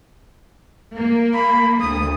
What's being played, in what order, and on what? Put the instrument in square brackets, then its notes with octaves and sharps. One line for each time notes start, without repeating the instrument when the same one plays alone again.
[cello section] A#3
[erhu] B5
[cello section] D2 [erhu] D#6